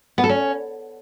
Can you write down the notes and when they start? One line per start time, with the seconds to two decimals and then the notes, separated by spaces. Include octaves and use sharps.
0.18 B3
0.24 A4
0.29 C#4